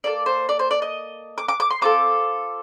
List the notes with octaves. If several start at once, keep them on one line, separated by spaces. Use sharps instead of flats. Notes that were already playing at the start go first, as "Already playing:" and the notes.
A#3 F4 A4 D5
C5
D5
C5
D5
D#5
D6
D6
D6
C6
C4 F4 A4 D6